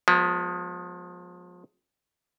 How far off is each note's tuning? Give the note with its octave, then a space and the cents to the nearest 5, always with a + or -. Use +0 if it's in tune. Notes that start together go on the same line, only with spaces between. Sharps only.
F3 +35 G#3 +0 B3 +0